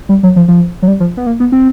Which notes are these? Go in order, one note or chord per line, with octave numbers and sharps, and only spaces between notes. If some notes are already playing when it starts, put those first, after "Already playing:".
G3
F#3
F3
F3
F#3
G3
F3
B3
A#3
B3
C4